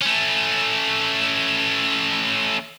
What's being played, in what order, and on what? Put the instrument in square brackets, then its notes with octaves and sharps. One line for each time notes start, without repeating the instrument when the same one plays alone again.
[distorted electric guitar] A3 C#4